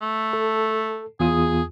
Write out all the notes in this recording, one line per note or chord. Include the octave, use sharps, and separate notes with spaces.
A3
A4
E2 F4 G#4 D#6